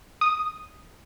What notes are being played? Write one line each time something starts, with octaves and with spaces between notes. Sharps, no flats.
D#6